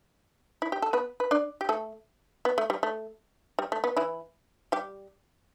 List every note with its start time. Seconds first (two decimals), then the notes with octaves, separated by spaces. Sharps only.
0.62 E4
0.72 G4
0.82 A4
0.93 B3 B4
1.20 B4
1.31 D4 D5
1.61 G4
1.69 A3 A4
2.45 B3
2.58 A3
2.70 G3
2.83 A3
3.59 G3
3.72 A3
3.84 B3
3.97 E3 E4
4.72 G3 G4